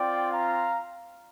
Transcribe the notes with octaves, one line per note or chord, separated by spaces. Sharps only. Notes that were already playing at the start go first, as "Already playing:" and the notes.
Already playing: C4 F4 D5 G5
F5 A#5